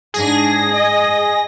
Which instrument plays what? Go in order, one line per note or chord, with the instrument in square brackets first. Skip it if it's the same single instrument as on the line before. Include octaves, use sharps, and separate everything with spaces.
[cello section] G#2 D4 [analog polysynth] G#4 A#6
[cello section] D#5